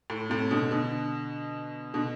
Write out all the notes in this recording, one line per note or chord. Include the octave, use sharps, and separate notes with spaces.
A2
A2 C3
B2 D3
B2 D3
B2 D3